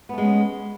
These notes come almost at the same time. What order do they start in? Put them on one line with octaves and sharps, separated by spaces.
B3 A3 G#3 C#4